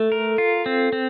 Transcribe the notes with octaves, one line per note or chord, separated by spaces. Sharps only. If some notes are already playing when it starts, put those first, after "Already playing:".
Already playing: A3 A4
A#4
F4
C4
C4